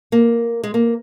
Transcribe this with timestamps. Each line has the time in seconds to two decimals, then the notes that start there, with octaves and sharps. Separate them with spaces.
0.12 A#3
0.64 G#3
0.74 A#3